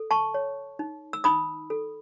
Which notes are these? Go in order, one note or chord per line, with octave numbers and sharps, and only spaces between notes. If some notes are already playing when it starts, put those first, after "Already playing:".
Already playing: A4
A5 C#6
C#5
D#4
E6
D#4 B5 D#6
A4